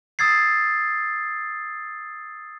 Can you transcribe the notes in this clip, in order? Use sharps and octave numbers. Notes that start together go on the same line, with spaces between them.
D#6 E6 G#6 A6 C7